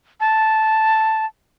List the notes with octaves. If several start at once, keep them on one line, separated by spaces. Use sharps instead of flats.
A5